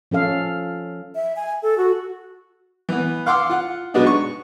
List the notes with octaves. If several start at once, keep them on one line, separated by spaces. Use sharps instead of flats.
F3 C#4 A4 F5
E5
G#5
A4
F#4
E3 B3
F5 F#5 C6 D6 E6
F4 F#5
B2 F#3 G#3 B3 D4 D#4
C#6